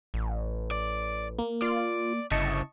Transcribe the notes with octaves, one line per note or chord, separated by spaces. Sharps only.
A1
D5
A#3
F4 D5
G1 C#3 E4 D#5 A5 C#6